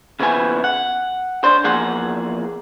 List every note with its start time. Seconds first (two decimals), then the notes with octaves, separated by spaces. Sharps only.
0.20 D#2 C#3 F3 B3 E4 G#5
0.64 F#5
1.44 D4 C5
1.64 E2 F3 A#3 G#4 F#5